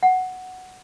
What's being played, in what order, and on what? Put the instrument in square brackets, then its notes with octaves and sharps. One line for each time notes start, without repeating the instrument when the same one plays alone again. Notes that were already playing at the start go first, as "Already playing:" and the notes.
[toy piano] F#5